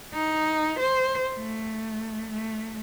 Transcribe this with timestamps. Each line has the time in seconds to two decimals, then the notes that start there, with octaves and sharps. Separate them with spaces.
0.14 D#4
0.80 C5
1.37 A3
2.30 A3